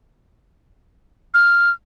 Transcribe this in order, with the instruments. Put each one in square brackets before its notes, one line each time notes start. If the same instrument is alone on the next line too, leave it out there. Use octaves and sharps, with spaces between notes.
[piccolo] F6